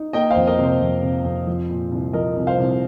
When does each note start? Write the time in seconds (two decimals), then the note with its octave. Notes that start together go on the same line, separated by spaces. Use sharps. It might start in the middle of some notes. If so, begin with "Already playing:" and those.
Already playing: D#4
0.13 A#3 D#5 G5
0.30 C5 F5
0.36 F2
0.47 A#4 D#5
0.59 C3 C5
0.81 F2
1.03 C3
1.25 F2
1.47 F3
1.70 A#2
1.92 C2
2.13 F3 A#4 D#5
2.36 C2
2.47 C5 F5
2.58 C2